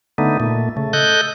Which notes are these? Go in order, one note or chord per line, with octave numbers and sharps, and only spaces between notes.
D3 A3 B3 D#4
A#2 A3
C#3 A3
A4 D#5 F#6 G6